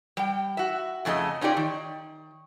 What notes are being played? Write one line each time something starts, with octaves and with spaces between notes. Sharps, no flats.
G3 G5
F#4 E5
F2 C#3 A3 E4 D#5
C#4 D#4 F4 G4 D5
D#3